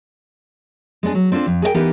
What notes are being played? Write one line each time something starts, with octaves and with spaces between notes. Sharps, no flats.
G#3 B3 D4 G#4
F#3
C4 D4 F4 A4
F2
G#4 A#4 D#5 G5
E3 B3 D#4 G4 A#4